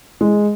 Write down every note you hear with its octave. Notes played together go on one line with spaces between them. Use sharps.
G#3